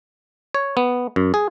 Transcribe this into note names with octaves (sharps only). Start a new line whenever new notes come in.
C#5
B3
F#2
G#4